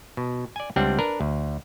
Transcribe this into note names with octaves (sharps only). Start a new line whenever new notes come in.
B2
D5 G#5
C#2 G3 C4 D4 F#5
D4 A#4 B4
D2